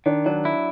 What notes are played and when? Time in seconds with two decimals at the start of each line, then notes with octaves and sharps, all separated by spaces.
0.06 D#3 D4
0.26 F#3 D4
0.45 E4